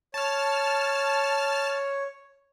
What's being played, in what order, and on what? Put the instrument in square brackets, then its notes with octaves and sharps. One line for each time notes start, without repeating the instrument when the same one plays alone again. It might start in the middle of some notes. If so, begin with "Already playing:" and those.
[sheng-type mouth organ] C#5 [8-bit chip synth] A5 F6